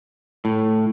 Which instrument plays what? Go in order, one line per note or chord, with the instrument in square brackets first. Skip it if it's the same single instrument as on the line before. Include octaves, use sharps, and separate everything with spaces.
[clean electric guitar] A2